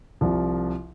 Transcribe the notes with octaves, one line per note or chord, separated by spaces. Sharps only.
C2 C3 F3